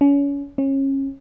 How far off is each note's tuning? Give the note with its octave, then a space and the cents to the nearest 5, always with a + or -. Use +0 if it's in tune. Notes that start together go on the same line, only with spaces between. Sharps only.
C#4 +30
C#4 -30